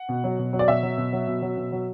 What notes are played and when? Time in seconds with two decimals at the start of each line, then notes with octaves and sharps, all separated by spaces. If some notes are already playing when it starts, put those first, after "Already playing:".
Already playing: F#5
0.09 B2
0.24 F#3
0.39 B2
0.53 F#3
0.59 D5
0.68 B2 E5
0.83 F#3
0.98 B2
1.13 F#3
1.27 B2
1.42 F#3
1.57 B2
1.72 F#3